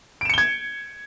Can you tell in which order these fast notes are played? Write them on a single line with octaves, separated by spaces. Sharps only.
D7 E7 C#7 G7 G#6